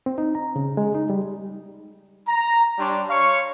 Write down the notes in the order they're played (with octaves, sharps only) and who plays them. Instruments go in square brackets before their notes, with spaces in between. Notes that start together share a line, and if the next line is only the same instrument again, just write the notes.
[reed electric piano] C4
D#4
A#5
C#3
G#3
D#4
G3
[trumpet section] A#5
G3 D4 C#5 C6
C#5 F5 C#6